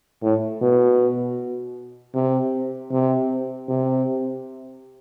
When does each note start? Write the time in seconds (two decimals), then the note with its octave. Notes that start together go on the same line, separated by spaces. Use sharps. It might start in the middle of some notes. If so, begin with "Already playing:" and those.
0.23 A2
0.62 B2
2.14 C3
2.92 C3
3.69 C3